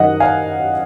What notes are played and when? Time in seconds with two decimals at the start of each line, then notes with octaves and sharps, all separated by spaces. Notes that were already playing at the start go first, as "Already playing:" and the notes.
Already playing: F#2 D#3 F#3 D#5 F#5
0.20 F5 G#5